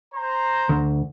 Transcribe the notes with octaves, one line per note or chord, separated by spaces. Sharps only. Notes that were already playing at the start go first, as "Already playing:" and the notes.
C5 A#5
D2